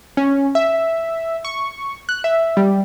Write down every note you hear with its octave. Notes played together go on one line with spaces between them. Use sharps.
C#4
E5
C#6
F#6
E5
G3